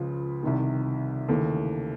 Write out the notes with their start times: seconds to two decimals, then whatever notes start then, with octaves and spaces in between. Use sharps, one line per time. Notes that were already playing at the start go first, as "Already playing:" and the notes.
Already playing: C#2 C#3 F3
0.43 C2 C3 D#3
1.28 D#2 C#3 E3 A3